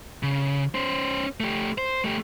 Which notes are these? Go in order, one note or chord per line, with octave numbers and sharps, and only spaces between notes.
C#3
C#4 C5
A3 G4
C5
A3 G4